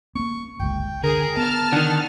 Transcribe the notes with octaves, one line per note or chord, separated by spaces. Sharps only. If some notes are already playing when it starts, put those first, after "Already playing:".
A#3 B3 C#6
G1 C#2 G#3 G5
D3 G#4 A#4
B3 A5 F6
D3 D#3 F#5